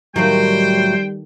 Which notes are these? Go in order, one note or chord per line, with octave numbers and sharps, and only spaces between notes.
A2 D#3 F#3 G3 A3 C5 G5